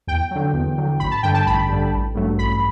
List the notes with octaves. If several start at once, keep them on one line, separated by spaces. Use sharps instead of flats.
E2 G5
D3 F#3
E2
D3 F#3
A1 B5
A5
G2 D3 G5
A5
A1 B5
G2 D3
A1
G2 F#3 A3
A1 B5